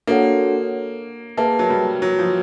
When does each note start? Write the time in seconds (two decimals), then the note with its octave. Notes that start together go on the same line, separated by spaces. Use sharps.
0.07 A#3 D4 F#4 A4 C#5 F#5
1.37 A#3 G#4 B4 E5 A5
1.59 F#3
1.70 G3
2.02 F#3
2.19 F3